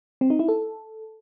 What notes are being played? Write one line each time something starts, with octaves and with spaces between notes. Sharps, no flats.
C4
D#4
E4
A4